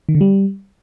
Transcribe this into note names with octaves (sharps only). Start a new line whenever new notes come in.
D#3
D3
G3